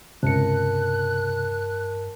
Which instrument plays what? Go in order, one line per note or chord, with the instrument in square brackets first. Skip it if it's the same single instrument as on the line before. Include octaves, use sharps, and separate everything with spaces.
[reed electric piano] C#2 C3 [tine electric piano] G2 C#7 [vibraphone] A#4 A5 [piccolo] F#6